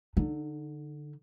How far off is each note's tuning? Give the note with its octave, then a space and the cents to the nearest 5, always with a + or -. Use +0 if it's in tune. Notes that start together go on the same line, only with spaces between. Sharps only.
D3 +0 D#4 -30